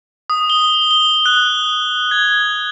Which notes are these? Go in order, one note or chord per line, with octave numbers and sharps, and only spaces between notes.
D#6
G7
G7
F#6
G#6